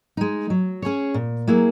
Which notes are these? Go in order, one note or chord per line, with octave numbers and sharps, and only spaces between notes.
G#3 D#4
F#3
C#4 G#4 C#5
A#2
F#3 A#3 E4 G#4